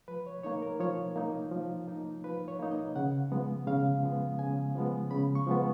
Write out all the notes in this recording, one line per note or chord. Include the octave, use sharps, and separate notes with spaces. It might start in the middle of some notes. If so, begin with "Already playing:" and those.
F3 B4
C#5
A#3 D#4 C#5
A#4
F3 C#5
A#3 D#4
F3
A#3 D#4
F3 B4
C#5
A#3 D#4
D#5
C#3 F#5
F3 G#3 B3
C#3 F5
F3 G#3 B3
C#3 G#5
F3 G#3 B3
C#3 B5
C#6
F3 G#3 B3